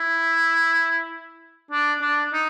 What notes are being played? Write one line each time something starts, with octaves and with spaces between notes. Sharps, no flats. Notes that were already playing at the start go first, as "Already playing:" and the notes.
Already playing: E4
D4
D4
D#4